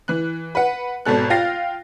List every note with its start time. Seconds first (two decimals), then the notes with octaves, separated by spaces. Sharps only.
0.08 E3 F#6
0.55 B4 F#5
1.05 G#1 B2 A4 F#6
1.30 F4 F5 G5 A6 A#6 C7